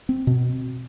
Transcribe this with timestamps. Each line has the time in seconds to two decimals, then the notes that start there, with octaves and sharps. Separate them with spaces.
0.09 C4
0.27 B2